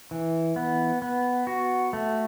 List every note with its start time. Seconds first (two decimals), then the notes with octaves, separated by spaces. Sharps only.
0.11 E3
0.56 B3
1.02 B3
1.47 F#4
1.93 A3